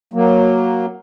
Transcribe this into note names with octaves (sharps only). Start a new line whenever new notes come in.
F#3 A#3